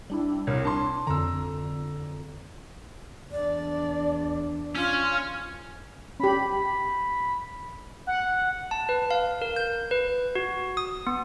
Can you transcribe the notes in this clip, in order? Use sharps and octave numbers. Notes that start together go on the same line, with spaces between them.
G3 D4 E4
C2 A#4 C#5
D4 A5 C6
F2 D3 A#5 E6
E2 D4 D5
C#4 F4
C#4 G4 B5
F#5
A5
B4
F5
A#4
G6
B4
F#4
D#6
B3